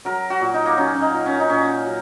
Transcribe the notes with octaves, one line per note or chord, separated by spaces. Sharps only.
F#3 A#4
F#4
A#2
D#4
A#3
F#3 C#4
C#4
D#4
A#2
C#4
D#4
A#2 C#4
F#3